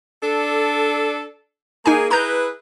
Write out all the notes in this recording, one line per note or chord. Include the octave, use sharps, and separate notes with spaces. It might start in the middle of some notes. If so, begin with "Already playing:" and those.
D4 A4
A#3 D#4 G#4 G#5
E4 G#4 B4 A#5 G6